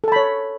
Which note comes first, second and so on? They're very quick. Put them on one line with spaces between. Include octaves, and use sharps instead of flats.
A4 A5 B5 C#5